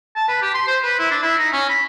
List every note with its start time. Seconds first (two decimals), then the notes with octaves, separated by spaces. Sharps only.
0.16 A5
0.28 B4
0.42 G4
0.54 C6
0.67 C5
0.83 B4
0.99 E4
1.11 D4
1.22 E4
1.38 D#4
1.53 C#4
1.69 B5